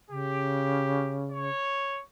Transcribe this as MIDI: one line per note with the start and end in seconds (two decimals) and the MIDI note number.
0.10 1.50 49
0.10 1.22 67
1.31 2.01 73